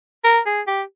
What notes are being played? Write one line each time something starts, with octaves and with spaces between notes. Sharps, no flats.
A#4
G#4
G4